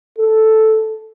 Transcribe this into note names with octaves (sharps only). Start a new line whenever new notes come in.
A4